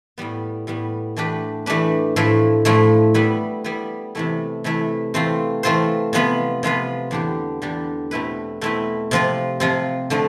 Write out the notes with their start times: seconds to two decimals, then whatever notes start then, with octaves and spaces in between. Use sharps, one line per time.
0.18 A2 G3 B3
0.67 A2 G3 B3
1.16 E3 A3 D4 G4 B4
1.66 E3 A3 D4 G4 B4
2.16 A2 F3 A3 E4
2.65 A2 F3 A3 E4
3.14 G3 B3 E4 B4
3.64 G3 B3 E4 B4
4.15 C3 E3 A3 E4
4.64 C3 E3 A3 E4
5.14 E3 A3 C4 F4 C5
5.63 E3 A3 C4 F4 C5
6.13 C3 F3 B3 F4 B4
6.63 C3 F3 B3 F4 B4
7.11 E2 D3 G3 D4 G4
7.62 E2 D3 G3 D4 G4
8.11 B2 A3 C4 E4 B4
8.61 B2 A3 C4 E4 B4
9.11 C3 F3 C4 F4
9.60 C3 F3 C4 F4
10.10 D3 F3 A3 C4